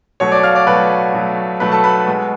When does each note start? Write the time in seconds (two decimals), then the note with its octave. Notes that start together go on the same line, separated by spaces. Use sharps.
0.20 B2 F#3 A3 C#5 C#6
0.32 D5 D6
0.43 F5 F6
0.55 D5 D6
0.67 B2 F#3 A3 B4 B5
1.14 B2 F#3 A3
1.60 B2 F#3 A3 B4 B5
1.72 A4 A5
1.84 B4 B5
2.07 B2 G#3